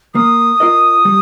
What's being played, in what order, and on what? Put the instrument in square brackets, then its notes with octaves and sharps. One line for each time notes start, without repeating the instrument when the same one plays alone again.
[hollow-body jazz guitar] A#3 [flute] D#6
[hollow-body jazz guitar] F4 A#4 D#5
G3